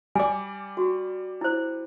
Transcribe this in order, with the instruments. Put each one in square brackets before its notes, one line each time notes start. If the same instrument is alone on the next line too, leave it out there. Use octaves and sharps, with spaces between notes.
[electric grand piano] G3 D5 [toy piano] G#5 D6
[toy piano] F#4 G4
E4 C5